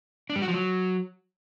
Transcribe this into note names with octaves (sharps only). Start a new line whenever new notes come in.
D4
G3
F#4
F3
F#3